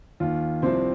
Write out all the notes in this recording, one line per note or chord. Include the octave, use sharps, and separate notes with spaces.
D#2 D#3 F4
C2 C3 F3 C4 C5